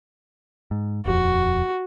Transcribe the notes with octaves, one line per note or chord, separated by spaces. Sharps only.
G#2
D#1 F2 F#4